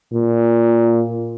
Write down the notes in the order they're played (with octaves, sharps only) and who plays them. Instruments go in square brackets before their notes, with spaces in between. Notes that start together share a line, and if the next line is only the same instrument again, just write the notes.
[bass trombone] A#2